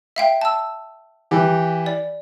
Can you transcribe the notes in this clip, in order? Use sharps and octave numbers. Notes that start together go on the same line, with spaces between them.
E5 F5 G5
A5 E6
E3 G4
D5